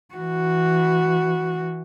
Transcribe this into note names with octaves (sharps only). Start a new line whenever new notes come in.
E3 F#4